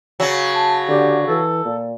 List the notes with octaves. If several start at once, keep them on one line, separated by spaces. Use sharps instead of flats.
C#3 F#3
A5
D3 G4
E3 A4
A#2